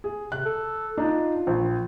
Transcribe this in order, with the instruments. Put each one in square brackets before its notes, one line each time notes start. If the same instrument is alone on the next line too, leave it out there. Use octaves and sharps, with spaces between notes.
[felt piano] G#4
[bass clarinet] C3 [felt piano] F#6
[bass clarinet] A4
[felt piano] D4 D#4 [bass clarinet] F4
[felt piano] A#1